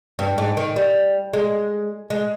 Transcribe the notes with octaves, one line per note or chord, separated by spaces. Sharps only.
G2
G#2
D#3
G3
G#3
G#3